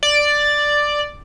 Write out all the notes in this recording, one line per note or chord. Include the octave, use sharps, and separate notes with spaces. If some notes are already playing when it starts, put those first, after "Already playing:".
D5